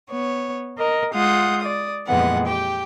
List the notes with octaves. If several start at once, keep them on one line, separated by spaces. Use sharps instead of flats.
B3 C#5
A#4 D#5
G#3 F4 F#5 D#6 G6
D5 D#6
F2 A#2 E3 G#3 B3 F#5
G4 G5